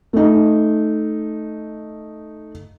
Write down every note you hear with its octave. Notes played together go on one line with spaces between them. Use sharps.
A3 D#4